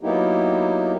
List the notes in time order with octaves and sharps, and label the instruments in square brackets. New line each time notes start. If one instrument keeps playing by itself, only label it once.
[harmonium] F#3 A#3 B3 D#4 E4 G4